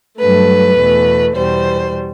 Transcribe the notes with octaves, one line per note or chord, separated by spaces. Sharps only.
G2 F#3 A3 B4
E2 B2 A3
E2 B2 G3 C5